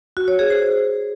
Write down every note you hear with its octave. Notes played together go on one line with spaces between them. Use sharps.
F#4
C#5
G#4
C5